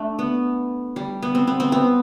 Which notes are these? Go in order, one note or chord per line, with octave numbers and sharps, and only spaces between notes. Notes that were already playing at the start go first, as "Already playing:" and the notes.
Already playing: A3 D4
B3
G3
B3
C4
B3
C4
B3